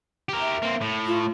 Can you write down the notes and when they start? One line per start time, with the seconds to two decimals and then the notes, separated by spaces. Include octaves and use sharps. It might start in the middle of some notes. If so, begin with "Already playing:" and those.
0.29 G4 A#4
0.40 E5
0.63 A#3 C4
0.81 A2
1.06 F4